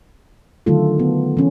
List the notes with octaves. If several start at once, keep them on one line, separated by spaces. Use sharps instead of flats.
D3 D#3 F#3 A3 F4 A4
B3
E3 C#4